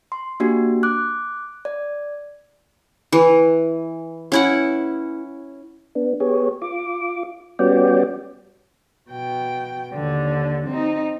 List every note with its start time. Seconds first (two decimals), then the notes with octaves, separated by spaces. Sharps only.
0.12 C6
0.40 A#3 D4 F#4 G4
0.83 D6 F#6
1.65 D5
3.12 E3
4.32 C#4 E4 F#5
5.95 B3 D4
6.20 B3 G4 G#4 C#5
6.62 F4 D6
7.59 G3 B3 C#4 F#4 D5 G5
9.11 B2 G5
9.94 D#2 D3
10.67 C4 D#4